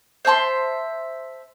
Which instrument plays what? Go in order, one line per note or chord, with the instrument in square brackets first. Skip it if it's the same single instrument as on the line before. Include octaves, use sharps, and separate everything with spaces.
[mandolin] C5 E5 A5 C6